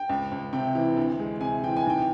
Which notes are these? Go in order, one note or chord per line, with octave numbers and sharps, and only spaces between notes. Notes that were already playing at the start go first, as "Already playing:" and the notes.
Already playing: G5
C#2
C#2
C3 G5
E3
D2
G#3
C3 G#5
E3 G5
G#5
B1 G5